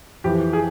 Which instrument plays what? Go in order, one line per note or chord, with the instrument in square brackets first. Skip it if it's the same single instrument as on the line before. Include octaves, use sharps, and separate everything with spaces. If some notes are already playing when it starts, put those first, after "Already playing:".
[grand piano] F2 E3 G4
G#4